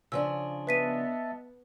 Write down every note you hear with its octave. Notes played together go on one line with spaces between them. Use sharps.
C#3 F3 D4 E6
B3 B4 D#5 E5 A5 B6 D#7